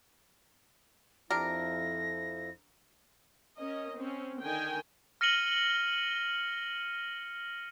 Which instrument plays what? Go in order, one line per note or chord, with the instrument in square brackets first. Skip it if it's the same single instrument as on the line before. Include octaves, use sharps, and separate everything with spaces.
[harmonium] F2 F3 E4 [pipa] D4 G4 A#4 [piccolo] A#6
[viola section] C#4 A#4 D#5
C4 C#4
D3 D#3 G5 G#5
[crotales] F6 A#6 C#7 D#7 F#7 G7